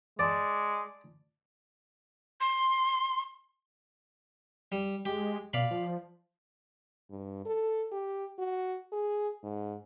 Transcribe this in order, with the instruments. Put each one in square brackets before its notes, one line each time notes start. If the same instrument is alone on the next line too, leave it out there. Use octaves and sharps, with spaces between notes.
[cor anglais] G#3 [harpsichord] D5 A5
[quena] C6
[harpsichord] G3
[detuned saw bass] G#3 [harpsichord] G4
[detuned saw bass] B2 [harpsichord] D5 F5 B5
[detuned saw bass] F3
[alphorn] G2
A4
G4
F#4
G#4
G#2